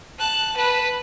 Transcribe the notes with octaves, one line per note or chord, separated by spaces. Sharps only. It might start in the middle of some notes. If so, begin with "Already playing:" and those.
A5 F#6
B4 A5